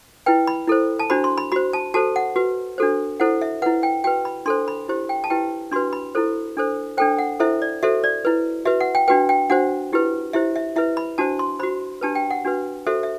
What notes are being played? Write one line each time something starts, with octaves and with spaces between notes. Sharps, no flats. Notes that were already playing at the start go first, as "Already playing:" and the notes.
E4 B4 G5
B5
E4 A4 C5
A5
D4 F#4 C5 B5
C6
B5
F#4 C5 B5
A5
F#4 A4 C5 A5
F#5
F#4 B4
D4 F#4 A4 C5
E4 A4 C5 F#5
E5
E4 B4 F#5
G5
F#4 B4 G5
B5
D4 A4 C5 C6
B5
E4 G4 C5
G5
A5
E4 G4 B4 G5
D4 F#4 B4 C6
B5
E4 A4 C5
D4 A4 C5
D4 A4 C5 G5
F#5
E4 A4 C5 E5
D5
F#4 A4 C5 E5
D5
E4 B4
F#4 B4 E5
F#5
G5
D4 F#4 B4 G5
G5
D4 F#4 C5 F#5
E4 G4 B4
E4 G4 C5 E5
E5
E4 B4 E5
B5
D4 F#4 C5 A5
C6
F#4 C5 B5
D4 G4 B4 A5
G5
F#5
D4 F#4 B4
F#4 A4 C5 E5
E5